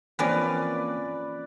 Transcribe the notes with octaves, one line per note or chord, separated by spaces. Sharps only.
E3 F3 A#3 C4 C#4 A#4 B4 D5